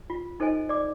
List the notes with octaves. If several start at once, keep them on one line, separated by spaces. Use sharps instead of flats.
F4
D#4 A4 C5 D#5 G#5
D5 D6